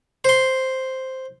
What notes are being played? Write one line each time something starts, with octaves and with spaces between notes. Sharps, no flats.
C5 C6